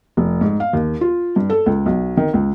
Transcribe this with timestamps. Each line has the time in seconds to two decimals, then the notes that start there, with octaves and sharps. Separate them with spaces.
0.17 F1
0.41 G#2
0.60 F5
0.73 D#2
1.01 F4
1.36 G2
1.50 A4
1.66 C#2
1.86 B1
2.17 D#3
2.34 C#2